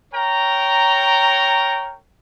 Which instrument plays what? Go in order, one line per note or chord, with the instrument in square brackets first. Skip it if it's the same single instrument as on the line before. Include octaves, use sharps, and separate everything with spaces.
[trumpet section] A#4 C#5 G5 A#5